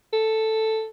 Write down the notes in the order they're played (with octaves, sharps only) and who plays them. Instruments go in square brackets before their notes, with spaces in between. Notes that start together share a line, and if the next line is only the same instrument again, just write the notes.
[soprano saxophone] A4